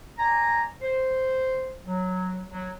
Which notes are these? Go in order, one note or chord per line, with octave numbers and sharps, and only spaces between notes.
D5 G#5 A#5
C5
F#3
F#3